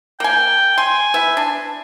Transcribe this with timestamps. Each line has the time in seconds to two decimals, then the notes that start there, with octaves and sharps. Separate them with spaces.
0.20 A#3 G5 G#5
0.78 G#5 C6
1.14 B3 E4 E5
1.37 D4